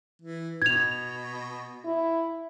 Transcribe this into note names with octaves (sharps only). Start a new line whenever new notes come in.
E3
B2 G#6 F7
E4